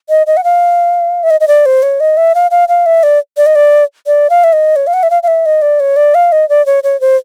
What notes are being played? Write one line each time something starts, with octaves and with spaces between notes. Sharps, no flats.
D#5
D#5
F#5
F5
E5
D#5
D#5
D5
C5
C#5
D#5
E5
F5
F5
F5
E5
D5
D5
D#5
D5
D5
F5
E5
D#5
C#5
F5
F#5
E5
F5
F5
E5
D#5
D5
C#5
D5
F5
D#5
D5
C#5
C#5
C5